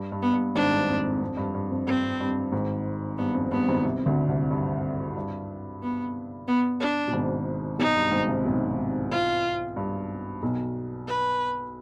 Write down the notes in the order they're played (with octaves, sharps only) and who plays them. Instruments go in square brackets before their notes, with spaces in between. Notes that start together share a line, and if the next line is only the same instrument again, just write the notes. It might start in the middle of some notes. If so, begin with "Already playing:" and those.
Already playing: [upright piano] G2
G2
[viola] B3
[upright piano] G2
[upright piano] G#1 G#2 [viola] D4
[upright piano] G2
F2
F2
G2
G2
F2
[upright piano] G2 [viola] C4
[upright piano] G2
G#1 G#2
[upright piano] G2 [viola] B3
[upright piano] F2
[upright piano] G2 [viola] B3
[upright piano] G#1 G#2
C2 C3
D2 D3
C2 C3
G2
G2
[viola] B3
B3
D4
[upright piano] B2
G#1 G#2
[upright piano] B1 B2 [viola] D#4
[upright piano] G2
G#1 G#2
C2 C3
B1 B2
[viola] F4
[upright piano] G2
B1 B2
[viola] B4